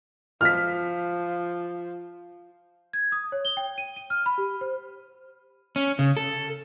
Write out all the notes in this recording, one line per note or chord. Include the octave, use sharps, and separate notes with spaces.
F3 F6 B6
G#6
D#6
C#5
G7
G5
D#7
D#7
F6
B5
G4
C5
C#4
C#3
A4